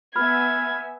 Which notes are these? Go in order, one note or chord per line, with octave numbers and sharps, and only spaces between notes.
B3 E5 G#5 B5 F6 G#6